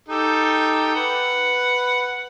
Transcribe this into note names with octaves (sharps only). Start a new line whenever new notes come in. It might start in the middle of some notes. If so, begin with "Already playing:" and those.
D#4 G4 A4
B4 F#5